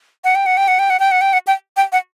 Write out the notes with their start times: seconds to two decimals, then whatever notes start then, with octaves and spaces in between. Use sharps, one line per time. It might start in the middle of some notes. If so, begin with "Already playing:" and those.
0.24 F#5
0.35 G5
0.46 F#5
0.57 G5
0.68 F#5
0.79 G5
0.90 F#5
1.00 G5
1.11 F#5
1.21 G5
1.33 F#5
1.47 G5
1.77 G5
1.92 F#5